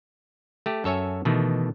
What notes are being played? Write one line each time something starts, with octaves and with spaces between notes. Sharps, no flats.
A3 G4
F#2 A4 C#5 E5 G#5
B2 D#3 E3 A3